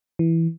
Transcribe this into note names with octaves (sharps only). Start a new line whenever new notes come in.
E3